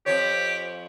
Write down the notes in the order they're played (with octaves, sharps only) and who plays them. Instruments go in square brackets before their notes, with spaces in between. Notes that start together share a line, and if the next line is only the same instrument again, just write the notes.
[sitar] F2 F3 C#5 [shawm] G4